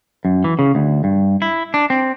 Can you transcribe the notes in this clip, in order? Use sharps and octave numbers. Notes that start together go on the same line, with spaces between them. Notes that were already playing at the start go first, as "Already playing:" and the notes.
F#2
E3
C#3
D2
G2
E4
D4
C4